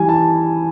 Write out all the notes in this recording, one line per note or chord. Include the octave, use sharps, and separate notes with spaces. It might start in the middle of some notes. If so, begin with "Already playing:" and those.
Already playing: E3 G3 G#5
A5